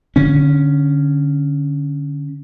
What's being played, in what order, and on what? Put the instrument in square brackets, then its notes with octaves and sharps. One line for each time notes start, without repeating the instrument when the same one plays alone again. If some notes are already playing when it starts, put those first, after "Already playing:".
[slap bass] D3 C#4